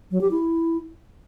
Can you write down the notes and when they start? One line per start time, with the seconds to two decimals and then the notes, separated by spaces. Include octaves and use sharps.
0.11 F#3
0.21 G4
0.31 E4